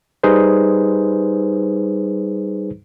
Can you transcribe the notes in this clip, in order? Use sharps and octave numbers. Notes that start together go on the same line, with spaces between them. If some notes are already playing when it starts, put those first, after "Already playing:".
G3 D#4 G#4 B4 C5